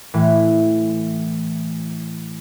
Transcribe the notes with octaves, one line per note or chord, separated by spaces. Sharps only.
A2 E3